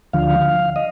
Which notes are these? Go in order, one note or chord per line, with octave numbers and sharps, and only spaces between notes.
D2 D3 F3 F5
D#5